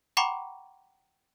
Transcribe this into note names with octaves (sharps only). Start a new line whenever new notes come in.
F#5 G5 A#5 B5 C#6 D6